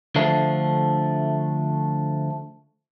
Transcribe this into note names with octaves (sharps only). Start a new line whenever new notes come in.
D3 F3 A3 D4